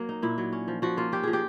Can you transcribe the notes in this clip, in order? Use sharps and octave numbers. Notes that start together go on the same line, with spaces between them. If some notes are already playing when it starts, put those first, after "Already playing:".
Already playing: F#3 A#3
D#4
A#2 E4
F#3
C#4
F3
F3 F#4
A#3 F4
C#4 G4
F3 G#4
G4